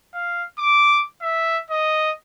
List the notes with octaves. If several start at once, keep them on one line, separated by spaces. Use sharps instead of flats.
F5
D6
E5
D#5